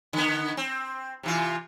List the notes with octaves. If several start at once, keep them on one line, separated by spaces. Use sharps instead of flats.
D3 B3
C4
C3 E3 F4